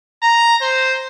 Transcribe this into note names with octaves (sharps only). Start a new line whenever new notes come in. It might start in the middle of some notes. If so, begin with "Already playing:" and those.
A#5
C5